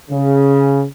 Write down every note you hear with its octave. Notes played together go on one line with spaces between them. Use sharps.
C#3